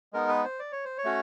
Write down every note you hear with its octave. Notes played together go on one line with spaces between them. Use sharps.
G#3 B3 D#4 A#4
B4
C5
D5
C#5
C5
C#5
A3 C#4 F#4